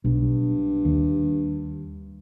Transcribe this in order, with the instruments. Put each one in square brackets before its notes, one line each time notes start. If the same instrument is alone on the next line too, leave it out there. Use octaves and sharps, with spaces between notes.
[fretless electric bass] B1 [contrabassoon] G2
[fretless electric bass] D#2